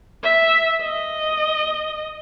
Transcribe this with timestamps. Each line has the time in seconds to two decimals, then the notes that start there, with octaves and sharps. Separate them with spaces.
0.23 E5
0.82 D#5